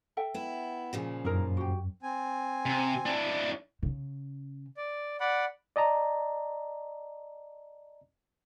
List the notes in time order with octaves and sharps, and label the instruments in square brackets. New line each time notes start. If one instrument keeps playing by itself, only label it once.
[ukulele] A4 E5 G5
[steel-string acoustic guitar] B3 E4
A#2 C#3 F3
[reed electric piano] F#2 [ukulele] D#4 E4 A#4
[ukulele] F#4 G4
[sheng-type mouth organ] C4 G#5
[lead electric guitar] C3
D4 E4
[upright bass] C#3
[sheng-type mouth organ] D5
D5 F#5 B5
[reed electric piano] D5 D#5 A5 A#5